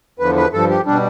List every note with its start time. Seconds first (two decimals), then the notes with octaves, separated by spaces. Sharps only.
0.19 E2 D3 F3 B4
0.36 B4
0.53 G2 F3 A4
0.69 G4
0.86 B2 G3 D4